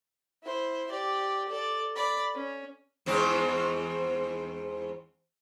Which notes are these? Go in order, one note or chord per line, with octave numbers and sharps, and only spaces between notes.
E4 C5
G4 D5
A4 D5
D5 B5
C#4
E2 G#2 C4